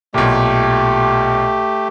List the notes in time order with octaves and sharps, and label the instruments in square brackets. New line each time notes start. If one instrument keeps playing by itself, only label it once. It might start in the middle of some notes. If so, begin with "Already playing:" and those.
[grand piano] B1 A#2 [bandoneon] A3 G4